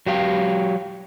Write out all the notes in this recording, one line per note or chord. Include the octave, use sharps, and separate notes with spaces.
F#3 G4 F5